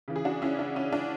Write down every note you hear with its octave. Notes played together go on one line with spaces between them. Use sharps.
C#3 E3
G#4
D4 F#4
C#4 E4
D4
C#4
D4